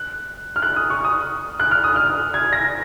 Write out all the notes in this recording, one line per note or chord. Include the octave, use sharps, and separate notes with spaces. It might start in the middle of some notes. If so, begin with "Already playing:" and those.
Already playing: F#6
F6
F#6
D#6
C#6
D#6
F#6
F6
D#6
F6
G#6
A#6